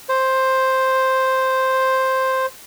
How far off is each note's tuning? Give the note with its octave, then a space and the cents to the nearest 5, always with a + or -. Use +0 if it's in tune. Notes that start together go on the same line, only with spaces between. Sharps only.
C5 +5